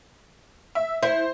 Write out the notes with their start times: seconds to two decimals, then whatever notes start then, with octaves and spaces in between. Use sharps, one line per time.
0.75 E5
1.03 E4 C5